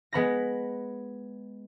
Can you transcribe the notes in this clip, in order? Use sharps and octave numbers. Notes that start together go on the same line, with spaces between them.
G#3 B3 B5 A#6